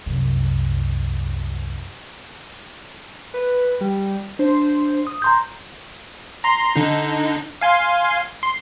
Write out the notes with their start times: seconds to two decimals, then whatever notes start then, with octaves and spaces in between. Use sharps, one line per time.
0.06 C2 F#2
3.34 B4
3.81 G3
4.39 D4 C5
5.07 D#6
5.22 A#5 C6 G6
6.44 A#5 C6
6.76 D3 D#4
7.61 F5 G#5 C6
8.43 C6